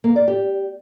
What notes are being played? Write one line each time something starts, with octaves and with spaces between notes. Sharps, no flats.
A#3
D5
G4